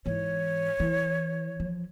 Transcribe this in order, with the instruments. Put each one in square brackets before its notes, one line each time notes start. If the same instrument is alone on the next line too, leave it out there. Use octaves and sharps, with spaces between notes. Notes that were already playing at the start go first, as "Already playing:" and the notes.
[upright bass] G#2 E3 [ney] C#5
[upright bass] E3
F3